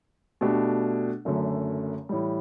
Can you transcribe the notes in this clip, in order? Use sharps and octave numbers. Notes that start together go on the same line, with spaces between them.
B2 A3 D4 G4
F#1 F#2 D3 A3
A2 E3 G3